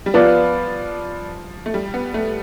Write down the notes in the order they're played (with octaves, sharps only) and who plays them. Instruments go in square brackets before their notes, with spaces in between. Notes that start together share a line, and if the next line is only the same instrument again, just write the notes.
[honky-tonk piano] G3
[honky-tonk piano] F3 [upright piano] B3 F4 B4 D5
[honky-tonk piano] A3
G3
B3
A3